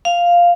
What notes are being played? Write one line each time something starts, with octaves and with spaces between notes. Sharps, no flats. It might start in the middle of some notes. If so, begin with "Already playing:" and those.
F5